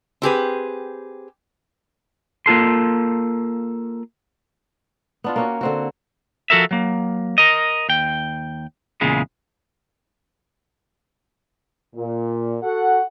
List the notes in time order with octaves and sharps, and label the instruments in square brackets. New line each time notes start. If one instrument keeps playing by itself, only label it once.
[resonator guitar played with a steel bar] C4 G4 G#4 B4
[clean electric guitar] A#3 F4 A4 C6
[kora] B3 D4 F4
A#3 C#4 F#4
D3 C4 F#4
[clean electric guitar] F3 F#4 A4 A#4 E5
F#3 A#3
A#4 D#5
D#2 G5
E2 A#2 C#3 G#3
[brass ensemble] A#2
F#4 A4 F#5